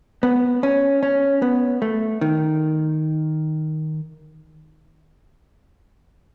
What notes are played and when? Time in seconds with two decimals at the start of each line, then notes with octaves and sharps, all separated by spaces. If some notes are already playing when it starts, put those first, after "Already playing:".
0.23 B3
0.63 C#4
1.03 C#4
1.42 B3
1.82 A3
2.21 D#3